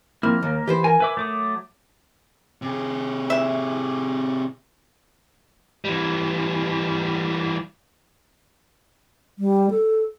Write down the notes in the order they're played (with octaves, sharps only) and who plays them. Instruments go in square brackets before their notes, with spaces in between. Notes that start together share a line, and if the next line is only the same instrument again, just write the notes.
[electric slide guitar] F3 C4 E4 [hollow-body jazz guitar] A#3 [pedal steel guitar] F6
[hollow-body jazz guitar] D#2 [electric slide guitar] A#3 A#4
[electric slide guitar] E3 [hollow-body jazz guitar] G4 B4 C5
[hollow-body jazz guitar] A#4 [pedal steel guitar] G#5
[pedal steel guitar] B4 E5 D6 [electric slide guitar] G#5
[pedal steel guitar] F#3 D6 D#6 [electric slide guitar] A3
[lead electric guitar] C3 G#4
[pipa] E5
[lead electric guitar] E3 G3
[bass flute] G3
A4